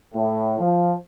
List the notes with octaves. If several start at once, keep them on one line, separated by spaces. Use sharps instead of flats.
A2
F3